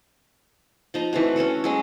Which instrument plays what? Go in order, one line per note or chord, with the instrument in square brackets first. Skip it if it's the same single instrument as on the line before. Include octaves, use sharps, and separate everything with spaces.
[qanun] F3 D#4 A#5
E3 A3 C4 F#4
C#4 F#4 A4 C#5
F#3 G#3 C#4